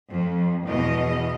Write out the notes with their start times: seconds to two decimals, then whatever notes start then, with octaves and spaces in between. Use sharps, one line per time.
0.10 F2
0.66 E2 B2 D#5